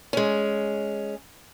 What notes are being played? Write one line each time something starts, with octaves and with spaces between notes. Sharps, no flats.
G#3 C#4